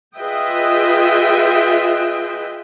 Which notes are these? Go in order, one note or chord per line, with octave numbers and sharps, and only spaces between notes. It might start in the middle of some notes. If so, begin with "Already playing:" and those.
F4 G#4 B4 D#5 E5 G5